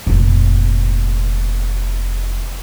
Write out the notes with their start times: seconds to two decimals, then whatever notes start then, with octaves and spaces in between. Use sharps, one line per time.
0.07 F1 A#2